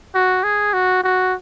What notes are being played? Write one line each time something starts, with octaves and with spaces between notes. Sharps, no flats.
F#4
G#4
F#4
F#4